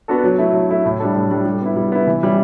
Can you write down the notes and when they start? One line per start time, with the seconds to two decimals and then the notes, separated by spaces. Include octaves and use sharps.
0.08 B3 D4 F#4 A4
0.24 F#3
0.38 A3 E4
0.53 F#3
0.70 A3 E4
0.85 A2
1.00 G3 D4 A4
1.15 A2
1.31 G3 D4 A4
1.46 G3
1.62 B3 E4
1.76 G3
1.92 B3 E4
2.07 E3
2.23 G3 C#4 E4